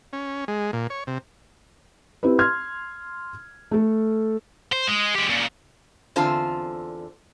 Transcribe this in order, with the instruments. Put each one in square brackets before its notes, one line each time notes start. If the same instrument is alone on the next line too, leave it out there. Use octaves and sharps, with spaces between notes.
[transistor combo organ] C#4
G#3
A#2
C#5
C3
[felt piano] C4 E4 G4 B4
C6 F6 G#6
A3 A4
[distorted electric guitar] C5
G#3
G#3 G4
A#2 C#3
[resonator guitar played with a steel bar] E2 D3 C4 F4 C5 A5